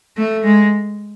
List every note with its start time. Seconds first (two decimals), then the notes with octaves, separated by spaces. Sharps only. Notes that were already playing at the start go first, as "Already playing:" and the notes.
0.17 A3
0.44 G#3